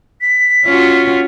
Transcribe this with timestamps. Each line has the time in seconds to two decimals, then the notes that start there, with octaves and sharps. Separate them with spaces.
0.21 B6
0.66 C#4 F4 F#4